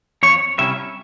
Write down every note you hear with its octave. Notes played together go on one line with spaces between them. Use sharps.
F2 C#5
C3 G3 C#4 E4 E5